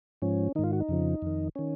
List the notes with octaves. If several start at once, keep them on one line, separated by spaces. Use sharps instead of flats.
G#2 F3 C#4
G#2 D#3 D#4 F4
F#4
D#4
F2 C#3 F3
F2 D#3
D#3 C#4